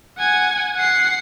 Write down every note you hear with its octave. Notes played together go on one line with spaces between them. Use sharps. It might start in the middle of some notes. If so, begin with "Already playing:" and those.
F#5 G#5
F#5 C7